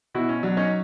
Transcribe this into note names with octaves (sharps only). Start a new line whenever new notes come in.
B2 E4 F#4
C#4
F#3 D4
C#4 D#4